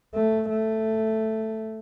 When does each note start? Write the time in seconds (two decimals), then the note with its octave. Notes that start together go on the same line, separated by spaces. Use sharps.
0.15 A3
0.50 A3